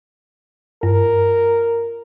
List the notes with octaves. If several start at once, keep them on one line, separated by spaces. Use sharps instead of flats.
G2 A#4